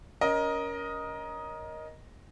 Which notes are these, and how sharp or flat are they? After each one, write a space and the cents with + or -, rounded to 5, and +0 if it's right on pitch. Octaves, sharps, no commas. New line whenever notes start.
C#4 +25 A#4 +20 D#5 +0